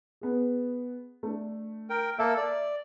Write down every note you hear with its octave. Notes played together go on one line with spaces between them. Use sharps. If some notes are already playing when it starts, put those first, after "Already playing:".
B3 G#4
A3 D4
A#4 G5
A#3 A4 E5
D5